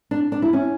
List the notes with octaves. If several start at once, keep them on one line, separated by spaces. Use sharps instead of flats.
D4
D4
E4
C#4